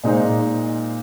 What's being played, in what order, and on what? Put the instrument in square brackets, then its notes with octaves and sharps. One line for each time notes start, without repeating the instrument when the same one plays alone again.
[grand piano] A#2 G#3 D#4 C5